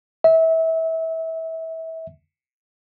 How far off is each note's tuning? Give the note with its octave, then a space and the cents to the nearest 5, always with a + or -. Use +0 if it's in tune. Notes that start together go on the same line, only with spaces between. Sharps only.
E5 -25